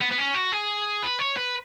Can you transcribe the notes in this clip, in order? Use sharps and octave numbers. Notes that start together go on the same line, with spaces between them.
B3
B3
C#4
F#4
G#4
B4
C#5
B4